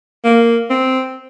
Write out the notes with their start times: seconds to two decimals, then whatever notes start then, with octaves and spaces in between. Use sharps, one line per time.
0.25 A#3
0.70 C4